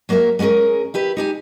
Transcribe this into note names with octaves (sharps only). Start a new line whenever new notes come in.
F#3 A#3 F#4 A#4 E5
G#3 B3 C#4 G#4 A#4
E4 G4 B4
D#4 G4 G#5